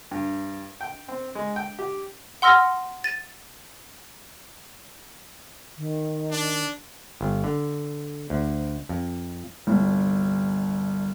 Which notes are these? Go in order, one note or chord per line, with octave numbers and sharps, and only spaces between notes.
G2
G5
C4
G#3
G5
G4
F#5 C6 E6 F6 A#6
A6 D#7
D#3
D4
G1
D3
D2
F2
G1 C2